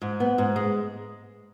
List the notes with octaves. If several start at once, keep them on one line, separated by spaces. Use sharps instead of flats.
G#2
B3
G#2
G#3